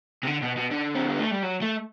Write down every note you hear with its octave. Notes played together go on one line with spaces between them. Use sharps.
C3
D3
B2
B2
D3
C4
B3
A3
G3
F#3
A3